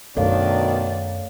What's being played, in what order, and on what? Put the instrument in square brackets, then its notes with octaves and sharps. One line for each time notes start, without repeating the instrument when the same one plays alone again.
[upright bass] F#2 A3 [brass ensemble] B2 D#3 [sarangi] D4 [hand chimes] A4 C#5 F5